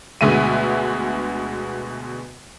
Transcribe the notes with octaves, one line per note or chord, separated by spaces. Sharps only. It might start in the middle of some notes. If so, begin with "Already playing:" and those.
D2 B2 D3 G#3 E5 D#7